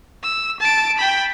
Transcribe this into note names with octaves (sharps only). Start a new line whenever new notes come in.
E6
A5 D7
G5 B5